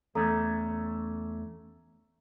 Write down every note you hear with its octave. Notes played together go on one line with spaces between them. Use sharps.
E2 A3 C#4 A4 A#5